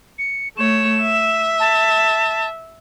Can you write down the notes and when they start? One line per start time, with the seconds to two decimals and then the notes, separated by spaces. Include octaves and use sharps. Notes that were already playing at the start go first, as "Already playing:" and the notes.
0.19 C#7
0.57 A3 C#5 E7
1.02 E5
1.60 A5